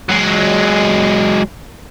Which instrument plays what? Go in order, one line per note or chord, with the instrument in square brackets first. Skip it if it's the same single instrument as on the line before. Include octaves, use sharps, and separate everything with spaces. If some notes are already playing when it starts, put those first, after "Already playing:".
[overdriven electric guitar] F#3 G#3